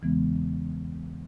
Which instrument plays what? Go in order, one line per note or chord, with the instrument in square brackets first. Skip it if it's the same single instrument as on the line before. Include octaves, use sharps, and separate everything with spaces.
[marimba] E2 C#3 E3 G#3 B3